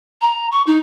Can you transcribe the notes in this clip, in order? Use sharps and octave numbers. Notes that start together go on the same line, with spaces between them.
A#5
C#6
D#4